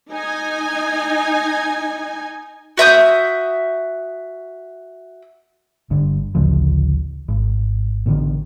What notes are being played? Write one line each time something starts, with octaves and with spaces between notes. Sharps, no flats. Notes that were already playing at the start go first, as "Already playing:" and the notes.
D#4 G#5
F#4 E5 D#6 G6
G1 G2 D3
A1 D2 C#3 F3
G#1
A1 B2 D3 D#3